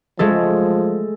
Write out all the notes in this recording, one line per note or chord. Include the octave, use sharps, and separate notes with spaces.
F3 G#3 A3 A4